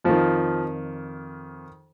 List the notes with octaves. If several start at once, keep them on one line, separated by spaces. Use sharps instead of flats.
F2 D#3 F3